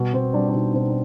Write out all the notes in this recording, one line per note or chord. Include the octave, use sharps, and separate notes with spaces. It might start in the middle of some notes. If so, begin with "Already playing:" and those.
Already playing: B2 G3
B2 C4
G3 D4
D4
B2 D#4
B2 C4
D4